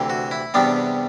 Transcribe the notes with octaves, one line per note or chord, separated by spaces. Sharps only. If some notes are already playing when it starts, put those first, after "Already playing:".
Already playing: D2 C3 E3
F#4
E4
E2 C3 G3 B3 D4